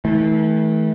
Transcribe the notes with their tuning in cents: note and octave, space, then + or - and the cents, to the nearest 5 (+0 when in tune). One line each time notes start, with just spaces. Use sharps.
E3 -45 A3 -25